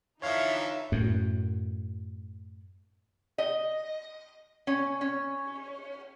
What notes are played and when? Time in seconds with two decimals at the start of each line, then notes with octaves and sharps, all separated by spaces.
0.22 D3 E3 F3 D#4 C#5 E5 F5
0.92 F#2 A2
3.38 D#5
4.67 C#4
5.01 C#4